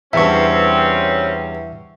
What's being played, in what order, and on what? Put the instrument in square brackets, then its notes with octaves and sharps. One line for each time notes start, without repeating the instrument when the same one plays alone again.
[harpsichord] E2 G2 [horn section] G3 C4 C#4 [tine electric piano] E5 C#6